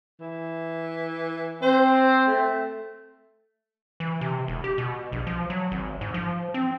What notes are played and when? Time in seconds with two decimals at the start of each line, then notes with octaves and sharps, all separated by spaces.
0.20 E3
1.62 C4 C5
2.27 A3
4.00 E3
4.21 C3
4.48 E1
4.64 G4
4.78 B2
5.12 A#1
5.27 F3
5.50 F#3
5.72 G#1
6.01 G#2
6.14 F3
6.54 C4